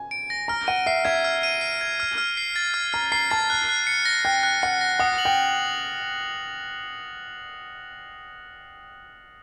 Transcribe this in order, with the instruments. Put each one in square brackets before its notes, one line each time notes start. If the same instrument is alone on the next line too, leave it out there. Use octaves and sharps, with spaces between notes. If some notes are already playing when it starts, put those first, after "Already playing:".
Already playing: [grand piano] G#5
[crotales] D7
A#6
[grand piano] A#5 [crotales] F6
[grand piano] F#5 [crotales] D#7
[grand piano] E5 [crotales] C7
[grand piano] E5 [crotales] G#6
[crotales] F6
D#7
C7
G#6
F6
F6
C7
A6
F6
[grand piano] A#5 [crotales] F6
[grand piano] A#5 [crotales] C7
[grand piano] A5 [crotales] A6
[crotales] F#6
F#6
C#7
A#6
[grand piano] G5 [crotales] F#6
[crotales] F#6
[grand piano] F#5 [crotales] C#7
[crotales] A#6
[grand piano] F#5 [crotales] D#6
[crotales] F#7
[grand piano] G5